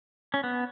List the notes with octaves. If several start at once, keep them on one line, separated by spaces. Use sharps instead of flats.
C#4
B3